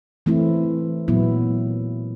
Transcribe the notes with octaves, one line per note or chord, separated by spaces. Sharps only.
E3 A3 C4 E4
A#2 F#3 B3 E4